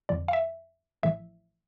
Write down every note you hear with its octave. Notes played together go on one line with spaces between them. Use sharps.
F2 D3 F3 D5
F5
E5
A1 A2 F3 E5